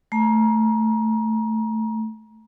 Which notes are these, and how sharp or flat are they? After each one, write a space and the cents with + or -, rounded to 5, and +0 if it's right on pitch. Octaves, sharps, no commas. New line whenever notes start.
A3 +0 A#5 +25